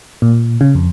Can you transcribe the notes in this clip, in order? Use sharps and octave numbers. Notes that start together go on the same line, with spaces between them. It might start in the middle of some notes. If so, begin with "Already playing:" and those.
A#2
C#3
F2